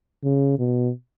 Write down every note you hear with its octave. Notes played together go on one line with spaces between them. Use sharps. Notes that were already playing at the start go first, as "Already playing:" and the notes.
C#3
B2